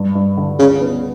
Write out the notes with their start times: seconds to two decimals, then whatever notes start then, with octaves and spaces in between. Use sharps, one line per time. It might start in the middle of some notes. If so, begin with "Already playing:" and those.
Already playing: G2
0.15 G2
0.37 D3
0.59 C#2 C#3
0.81 B3